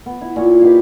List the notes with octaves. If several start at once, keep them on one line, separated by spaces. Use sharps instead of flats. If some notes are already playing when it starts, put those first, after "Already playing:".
B3
E4
A#2 C#5
G4 B4 D#5 F5